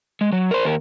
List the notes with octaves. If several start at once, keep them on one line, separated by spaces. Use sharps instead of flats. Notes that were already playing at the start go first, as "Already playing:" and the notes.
G#3
F#3
A#4 C5
D#2 A#4